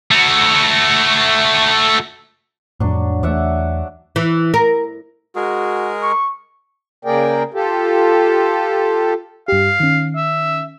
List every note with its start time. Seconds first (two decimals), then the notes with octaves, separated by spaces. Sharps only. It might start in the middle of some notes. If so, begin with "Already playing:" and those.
0.11 A3 F#4
2.80 F2 A2 F#3 D4
3.23 E2 A3 D5 E5 F#5
4.16 E3
4.54 A#4
5.36 G#3 F#4 G#4 A#4
6.03 C#6
7.05 C#3 A#3 G#4 A#4 D5 G5
7.54 F4 G4 A4
9.48 G2 G4 F5
9.80 D#3 C#4
10.16 E5